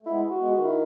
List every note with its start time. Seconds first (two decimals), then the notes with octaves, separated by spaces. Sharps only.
0.02 A3
0.06 G#3 B3 E4
0.30 F#4
0.38 G#3 B3
0.51 D#3 F#4
0.65 E4